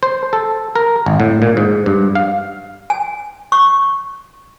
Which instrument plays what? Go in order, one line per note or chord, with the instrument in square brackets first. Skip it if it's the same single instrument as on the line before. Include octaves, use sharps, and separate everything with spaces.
[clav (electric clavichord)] C5
A4
A#4
G#1
A2
A#2
G#2
G2
F5
[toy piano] G#5
C#6